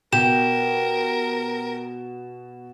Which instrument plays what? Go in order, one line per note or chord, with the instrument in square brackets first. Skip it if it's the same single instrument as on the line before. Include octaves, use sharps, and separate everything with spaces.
[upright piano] B2 [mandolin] G4 [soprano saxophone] A#4 [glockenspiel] E7